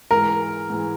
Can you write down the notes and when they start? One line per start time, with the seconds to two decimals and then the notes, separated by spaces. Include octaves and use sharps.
0.11 G#2 E3 G#3 A#4
0.70 G#2 E3 G#3